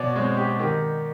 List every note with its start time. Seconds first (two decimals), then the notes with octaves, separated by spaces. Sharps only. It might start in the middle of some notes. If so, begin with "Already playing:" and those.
Already playing: B2 C#5 D5
0.15 G#3 C4 C#5
0.37 G4
0.59 D#3 G4